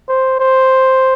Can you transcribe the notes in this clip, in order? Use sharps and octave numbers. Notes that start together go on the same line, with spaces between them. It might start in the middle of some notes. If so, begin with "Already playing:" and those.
C5
C5